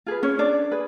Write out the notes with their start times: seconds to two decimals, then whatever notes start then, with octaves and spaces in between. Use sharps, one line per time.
0.06 F4 G#4 B4
0.23 C#4 C#5
0.39 D4 D5
0.71 G#4 B4